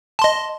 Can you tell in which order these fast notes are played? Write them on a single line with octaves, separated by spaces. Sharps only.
A5 C6 D#5